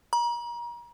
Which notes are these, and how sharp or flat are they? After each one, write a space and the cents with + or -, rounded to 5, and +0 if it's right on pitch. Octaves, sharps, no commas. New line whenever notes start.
A#5 +35